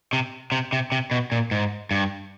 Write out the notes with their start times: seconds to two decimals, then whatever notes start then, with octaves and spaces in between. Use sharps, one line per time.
0.13 C3
0.52 C3
0.73 C3
0.92 C3
1.11 B2
1.32 A#2
1.51 G#2
1.91 G2